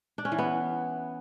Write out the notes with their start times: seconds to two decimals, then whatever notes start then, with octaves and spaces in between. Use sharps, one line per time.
0.18 D4
0.25 C#4
0.32 E3
0.38 B3